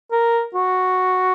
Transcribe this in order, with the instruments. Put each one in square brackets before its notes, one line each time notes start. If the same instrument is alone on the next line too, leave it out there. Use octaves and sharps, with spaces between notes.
[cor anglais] A#4
F#4